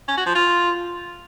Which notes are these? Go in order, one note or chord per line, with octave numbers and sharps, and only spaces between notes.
C#4
F#4
F3
F4